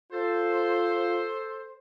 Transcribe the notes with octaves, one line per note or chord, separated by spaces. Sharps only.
F4 A4 C5